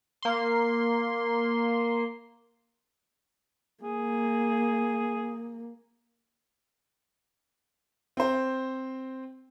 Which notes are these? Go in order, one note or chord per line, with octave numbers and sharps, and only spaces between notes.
A#3 C6
A#3 G#4
C4 C5